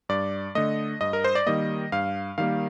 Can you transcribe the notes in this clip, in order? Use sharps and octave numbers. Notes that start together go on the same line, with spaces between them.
G2 D5
D3 A3 D#5
G2 D#5
A#4
C5
D5
D#3 G3 A#3 D#5
G2 F5
D#3 G3 A#3 F5